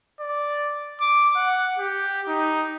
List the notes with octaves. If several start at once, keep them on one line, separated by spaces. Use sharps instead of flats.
D5
D6
F#5
G4
D#4